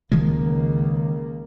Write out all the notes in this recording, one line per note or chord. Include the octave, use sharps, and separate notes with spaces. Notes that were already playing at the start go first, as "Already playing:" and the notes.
C#2 D#3 F3 G#3 A#3